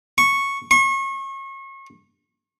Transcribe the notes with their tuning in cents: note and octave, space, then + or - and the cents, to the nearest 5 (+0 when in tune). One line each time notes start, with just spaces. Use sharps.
C#6 -5
C#6 -35